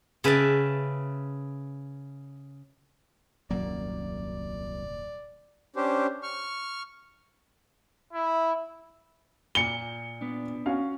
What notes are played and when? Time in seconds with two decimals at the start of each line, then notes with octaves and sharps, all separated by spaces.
0.24 C#3 B4 E5 G5 A5
3.51 D#1 C2 F#2 F#3 A#3 D5
5.76 C#4 D4 G4 C5
6.23 C#6 F6
8.13 E4
9.55 A#2 C#7 G7
10.21 B3 D4
10.66 C#4 F#4 F5